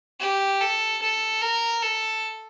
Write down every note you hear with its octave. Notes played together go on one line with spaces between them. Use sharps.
G4
A4
A4
A#4
A4